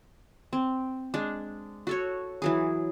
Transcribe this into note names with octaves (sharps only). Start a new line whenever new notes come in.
C4
G#3 D4
F#4 A4 C#5
E3 F#3 G#4